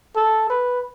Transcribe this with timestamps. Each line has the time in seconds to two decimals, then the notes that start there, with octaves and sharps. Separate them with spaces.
0.16 A4
0.50 B4